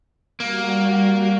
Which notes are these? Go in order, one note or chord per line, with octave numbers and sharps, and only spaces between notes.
G3 A#3 F#4